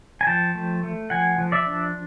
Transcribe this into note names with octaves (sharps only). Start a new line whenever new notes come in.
G#5
F3 G5 A5
A3
A3
F3 F#5 G#5
F3
D5 E5
D4